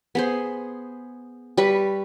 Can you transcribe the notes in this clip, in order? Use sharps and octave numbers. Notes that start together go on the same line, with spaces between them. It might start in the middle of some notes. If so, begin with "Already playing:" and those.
B3 G#4 C5
G3 B4 B5 C#6